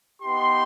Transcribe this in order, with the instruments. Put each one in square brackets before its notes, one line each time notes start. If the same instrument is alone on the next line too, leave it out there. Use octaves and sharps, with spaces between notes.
[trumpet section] B3 D#4 G4 C6